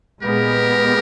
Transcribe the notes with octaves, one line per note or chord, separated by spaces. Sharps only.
A#2 G#3 B3 G4 A#4